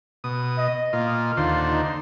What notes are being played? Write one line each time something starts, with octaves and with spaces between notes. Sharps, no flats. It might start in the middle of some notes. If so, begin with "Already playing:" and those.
B2 D#6
D#5
A#2 F4
D#2 D3 F4 C5
D#4